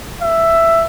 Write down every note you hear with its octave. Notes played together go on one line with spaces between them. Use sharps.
E5